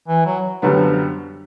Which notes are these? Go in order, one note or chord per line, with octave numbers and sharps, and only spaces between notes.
E3
F#3
F#2 D3 F#3 G3 B3
F3